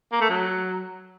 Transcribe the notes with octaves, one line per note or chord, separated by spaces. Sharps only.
A#3
A3
F#3